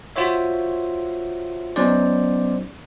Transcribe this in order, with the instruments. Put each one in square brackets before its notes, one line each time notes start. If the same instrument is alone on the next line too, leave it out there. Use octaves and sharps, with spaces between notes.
[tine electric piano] F4 F#4 C5 C#5 E5
F#3 B3 C#4 D#4 C5 D5